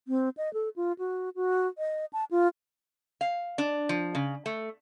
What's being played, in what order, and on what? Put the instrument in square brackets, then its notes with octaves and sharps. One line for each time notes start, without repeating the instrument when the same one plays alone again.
[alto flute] C4
D#5
A4
F4
F#4
F#4
D#5
A5
F4
[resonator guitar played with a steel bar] F5
D4
F3
C#3
A3